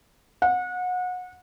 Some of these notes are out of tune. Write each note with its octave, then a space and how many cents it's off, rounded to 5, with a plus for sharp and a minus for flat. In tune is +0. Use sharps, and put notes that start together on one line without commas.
F#5 -30